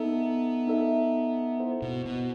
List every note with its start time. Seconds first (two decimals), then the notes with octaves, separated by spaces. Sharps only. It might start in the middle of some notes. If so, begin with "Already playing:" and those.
Already playing: B3 D#4 A4 E5
0.68 D#4 A4 E5
1.60 E4 A4 C5 F#5
1.82 B2
2.05 B2